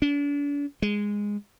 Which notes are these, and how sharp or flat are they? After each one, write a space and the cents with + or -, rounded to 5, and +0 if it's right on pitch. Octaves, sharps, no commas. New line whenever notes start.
D4 -40
G#3 -10